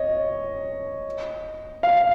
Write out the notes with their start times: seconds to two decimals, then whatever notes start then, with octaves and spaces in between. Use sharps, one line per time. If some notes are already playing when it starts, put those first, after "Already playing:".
Already playing: C#5 D#5
1.83 F5